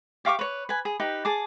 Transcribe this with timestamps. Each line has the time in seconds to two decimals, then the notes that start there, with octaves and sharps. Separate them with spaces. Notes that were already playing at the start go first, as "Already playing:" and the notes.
0.25 G4 F5 C#6 D6
0.39 B4 C#5
0.69 B4 G#5
0.85 G#4
1.00 D#4 G4 B4
1.25 G#4 A5 D6